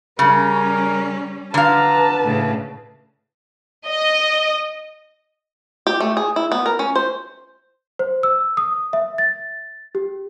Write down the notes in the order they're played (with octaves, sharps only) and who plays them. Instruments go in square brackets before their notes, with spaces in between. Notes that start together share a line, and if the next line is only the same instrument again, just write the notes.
[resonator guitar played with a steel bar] C#3 [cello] G3 C#4 [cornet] A#4
[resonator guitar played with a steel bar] D3 F5 [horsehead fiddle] B4 A5 [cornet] A#5
[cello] A2 C#3
[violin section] D#5
[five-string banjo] G4
A3
G#4
E4
B3
A#4
C#4
C5
[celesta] C5
E6
D#6
E5
A6
G4